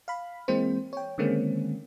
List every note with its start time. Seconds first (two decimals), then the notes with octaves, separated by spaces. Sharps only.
0.08 F5 B5
0.48 E3 G#3 A#3 C4 C5
0.93 C#5 G5
1.18 D3 D#3 G#3 A#3 C4 C#4